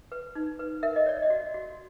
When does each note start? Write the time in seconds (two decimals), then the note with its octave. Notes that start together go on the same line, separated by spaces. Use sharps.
0.12 B4
0.35 D#4
0.59 B4
0.83 A#4 E5
0.96 D#5
1.06 C#5 D5
1.22 D#5
1.30 F#4
1.54 F#4